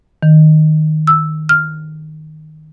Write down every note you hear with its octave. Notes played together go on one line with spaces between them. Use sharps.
D#3
E6
F6